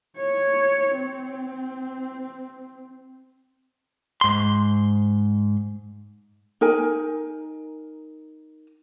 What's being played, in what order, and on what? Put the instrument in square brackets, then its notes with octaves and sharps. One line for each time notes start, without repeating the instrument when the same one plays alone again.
[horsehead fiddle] C#5
C4
[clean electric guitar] G#2 C6
[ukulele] D#4 A#4 G#5